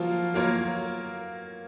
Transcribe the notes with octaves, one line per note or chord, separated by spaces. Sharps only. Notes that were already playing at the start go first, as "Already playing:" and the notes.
Already playing: F3 F#3 A#3 F4
F#3 A#3 F4 A#4 C#5